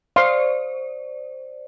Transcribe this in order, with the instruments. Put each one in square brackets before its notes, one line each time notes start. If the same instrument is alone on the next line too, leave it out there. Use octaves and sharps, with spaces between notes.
[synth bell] C5 D5 [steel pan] F5 C6